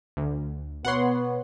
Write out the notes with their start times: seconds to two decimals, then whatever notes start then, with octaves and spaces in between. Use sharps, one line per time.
0.17 D2
0.85 B2 B3 B4 C#5 F#5 C6